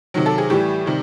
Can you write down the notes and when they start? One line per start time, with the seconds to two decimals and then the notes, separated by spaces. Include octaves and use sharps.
0.14 C3 D#3 F#3
0.26 A4
0.38 G#4
0.50 A2 E3 G3 G4
0.86 C3 D#3 G3